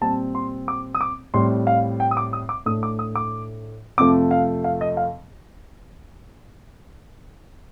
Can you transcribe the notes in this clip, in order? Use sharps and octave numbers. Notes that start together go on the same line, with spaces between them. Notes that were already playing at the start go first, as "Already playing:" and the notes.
A#2 G3 C4 A5
C6
D6
D#6
D6
A2 G3 C4 C6
F5
G5
D#6
D6
D#6
D6
A2 A3 D4 D#6
D6
D#6
D6
F2 C3 F3 A3 D6
F5
F5
D#5
F5